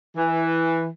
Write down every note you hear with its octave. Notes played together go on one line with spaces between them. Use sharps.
E3